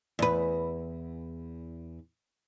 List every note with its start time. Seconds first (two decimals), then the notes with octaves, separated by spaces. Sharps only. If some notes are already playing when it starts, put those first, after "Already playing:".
0.19 E2 B4